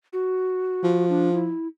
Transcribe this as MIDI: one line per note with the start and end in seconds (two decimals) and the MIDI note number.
0.13 1.05 66
0.83 1.52 53
1.09 1.31 62
1.33 1.67 64